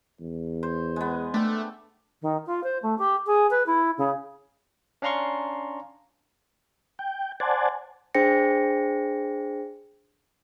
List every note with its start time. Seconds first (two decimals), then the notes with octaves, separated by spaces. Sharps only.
0.20 E2
0.63 C5
0.96 G#3 B3
1.34 A3 D4 G5
2.22 D#3
2.46 F4
2.63 C5
2.82 A3
2.98 G4
3.26 G#4
3.50 B4
3.66 E4
3.98 C#3
5.02 C#4 D4 F5 A#5 C6 C#6
6.99 G5
7.40 C5 D5 F#5 G#5 A5
8.15 D4 G#4 C5 G5 A#6 C#7